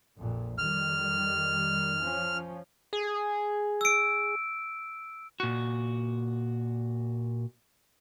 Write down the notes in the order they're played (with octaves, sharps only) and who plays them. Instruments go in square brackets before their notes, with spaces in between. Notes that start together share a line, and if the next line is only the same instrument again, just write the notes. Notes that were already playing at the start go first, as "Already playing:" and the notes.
[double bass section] A#1 F2 A#2
[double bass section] F2 D#3 G3 [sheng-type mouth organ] F6
[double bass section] F3 C#4
[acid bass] G#4
[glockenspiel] E6 D7
[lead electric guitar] A#2 F#4